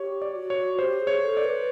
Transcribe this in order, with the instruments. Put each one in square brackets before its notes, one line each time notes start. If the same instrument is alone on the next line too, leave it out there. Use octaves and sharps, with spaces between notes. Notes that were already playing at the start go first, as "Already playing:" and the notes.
Already playing: [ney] G4 [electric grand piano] C#5
[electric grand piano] D5
[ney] F#4
[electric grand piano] C#5
[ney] G4 [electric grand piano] C5
[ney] G#4
[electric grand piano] C#5
[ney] A4
[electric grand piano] D5
[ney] B4